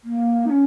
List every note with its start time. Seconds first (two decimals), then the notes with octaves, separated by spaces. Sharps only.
0.04 A#3
0.46 D#4
0.50 C#4